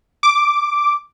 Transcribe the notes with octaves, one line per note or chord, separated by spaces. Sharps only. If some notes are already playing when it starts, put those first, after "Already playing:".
D6